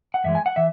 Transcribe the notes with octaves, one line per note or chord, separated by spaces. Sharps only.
F#5
F#2 E3 G#3 E5
G#5
F#5
E3 E5